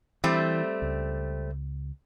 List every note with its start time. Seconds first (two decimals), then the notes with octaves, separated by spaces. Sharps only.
0.24 E3 G3 A3 C4
0.82 C#2